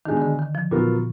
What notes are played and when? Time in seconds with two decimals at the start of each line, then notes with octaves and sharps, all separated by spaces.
0.06 B2 D#3 G#3 D4
0.17 D#3
0.22 D3
0.39 D#3
0.55 F3
0.71 A#2 F#3 B3 F4 A#4